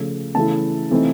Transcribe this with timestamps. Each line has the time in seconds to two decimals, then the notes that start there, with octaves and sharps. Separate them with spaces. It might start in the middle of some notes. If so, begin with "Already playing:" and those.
Already playing: C#3 F3 A3
0.35 C#3 E3 A3 C#4 E4 A5
0.90 C3 E3 A3 C4 D#4